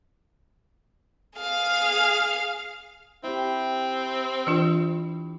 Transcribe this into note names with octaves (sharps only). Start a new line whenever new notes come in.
G#4 F5
C4 E4 G4
E3 D4 F4